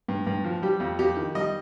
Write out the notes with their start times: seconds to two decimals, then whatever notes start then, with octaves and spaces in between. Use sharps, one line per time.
0.08 G2
0.27 G2
0.44 F3
0.62 G3 G4
0.80 F2
0.99 F2 G4
1.16 D#3
1.35 G3 D#5